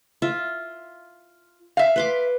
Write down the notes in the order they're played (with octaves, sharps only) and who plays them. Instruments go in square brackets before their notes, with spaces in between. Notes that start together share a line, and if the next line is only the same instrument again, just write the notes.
[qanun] F4 E5
[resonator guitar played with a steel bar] E5 F5
[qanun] B4 C6 D6